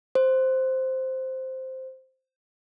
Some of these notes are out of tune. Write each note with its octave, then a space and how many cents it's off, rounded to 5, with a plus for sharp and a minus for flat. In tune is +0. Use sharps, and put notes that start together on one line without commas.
C5 +0